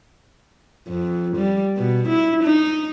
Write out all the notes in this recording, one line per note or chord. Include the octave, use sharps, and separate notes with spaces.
F2
G3
B2
E4
D#4